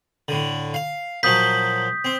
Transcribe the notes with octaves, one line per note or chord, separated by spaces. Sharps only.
A2 D3
F5
A#2 F3 F#3 D#6 G6 B6
C4